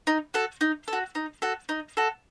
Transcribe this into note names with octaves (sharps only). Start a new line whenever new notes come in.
D#4
F#4 A4
D#4
A4
F#4
D#4
F#4 A4
D#4
F#4 A4